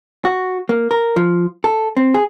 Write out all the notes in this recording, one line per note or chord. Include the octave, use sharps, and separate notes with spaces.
F#4
A#3
A#4
F3
A4
C4
G#4